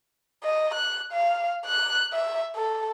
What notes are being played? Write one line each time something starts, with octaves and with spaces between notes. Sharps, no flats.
D#5
F#6
F5
F#6
E5
A4